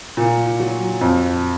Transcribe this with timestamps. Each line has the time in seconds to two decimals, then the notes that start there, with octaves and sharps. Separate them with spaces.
0.17 A#2
0.60 F#3
1.01 F2